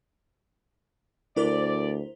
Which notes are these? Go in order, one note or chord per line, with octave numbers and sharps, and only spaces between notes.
D2 E4 A#4 C5 D5